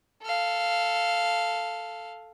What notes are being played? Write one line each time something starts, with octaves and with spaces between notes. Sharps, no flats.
A4 F5